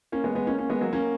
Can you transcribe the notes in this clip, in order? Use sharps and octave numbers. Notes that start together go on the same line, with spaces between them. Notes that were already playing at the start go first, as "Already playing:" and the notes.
A#3 C#4
G#3 B3
G#3 B3
A#3 C#4
A#3 C#4
G#3 B3
F#3 A#3
A#3 C#4